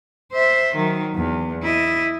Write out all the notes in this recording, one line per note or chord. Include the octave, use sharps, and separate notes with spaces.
C5 E5
D#3 F#3
E2
E4 D#5